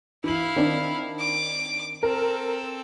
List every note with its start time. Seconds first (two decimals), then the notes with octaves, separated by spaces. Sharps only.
0.24 E3 E4 F5 F#7
0.56 D#3 C4 D4
1.20 D6
2.03 C4 A4 A#4